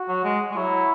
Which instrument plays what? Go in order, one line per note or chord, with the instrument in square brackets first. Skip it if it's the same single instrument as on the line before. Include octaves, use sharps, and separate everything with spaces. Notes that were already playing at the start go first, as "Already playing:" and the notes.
Already playing: [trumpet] F#4
[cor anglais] F#3
G#3
G#3
[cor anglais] F#3 [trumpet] E4